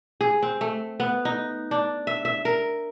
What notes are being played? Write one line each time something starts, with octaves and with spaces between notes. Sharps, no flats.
G#4
C4
A3
B3
D#4
D4
E5
E5
A#4